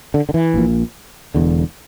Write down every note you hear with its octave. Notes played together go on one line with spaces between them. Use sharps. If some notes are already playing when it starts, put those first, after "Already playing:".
D3
D3
E3
A#1 A#2
E1 E2 D3